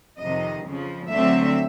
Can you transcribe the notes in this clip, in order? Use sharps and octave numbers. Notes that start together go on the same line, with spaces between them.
F2 C3 D#3 D#5
F2 C#3 F3
D2 D3 F#3 A3 C4 E5